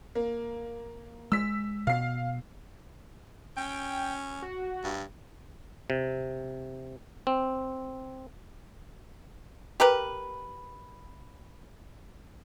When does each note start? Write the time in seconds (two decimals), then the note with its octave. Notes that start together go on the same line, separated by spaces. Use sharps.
0.15 A#3
1.32 G#3 E6 B6
1.87 B2 F5 C7
3.57 C#4 G5
4.42 F#4
4.84 G2
5.90 C3
7.27 C4
9.80 G4 A#4 B4